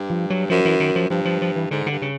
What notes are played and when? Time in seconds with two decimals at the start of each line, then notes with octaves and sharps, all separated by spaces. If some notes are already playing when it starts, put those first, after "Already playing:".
Already playing: G2
0.10 F3
0.30 F#3
0.50 F#2 F3
0.65 E3
0.80 D#3
0.96 F3
1.10 G2 F3
1.25 F3
1.42 F3
1.56 E3
1.71 G#2 D3
1.86 D3
1.91 G2
2.02 C#3